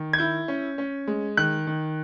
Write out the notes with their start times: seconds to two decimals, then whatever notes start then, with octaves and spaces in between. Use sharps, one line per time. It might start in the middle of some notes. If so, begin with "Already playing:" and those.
Already playing: D#3
0.13 G#6
0.18 E4 G6
0.48 C#4
0.78 C#4
1.07 G#3
1.37 D#3 F#6
1.67 D#3